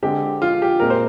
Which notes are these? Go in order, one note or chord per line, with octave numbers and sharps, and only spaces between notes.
D3 G#3 C4 G4
F4
G4
A#2 G#3 C4 A#4
C5